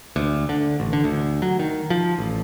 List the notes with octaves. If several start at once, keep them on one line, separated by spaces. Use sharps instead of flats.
D2
D3
A1
D3
D2
F#3
D#3
F3
A1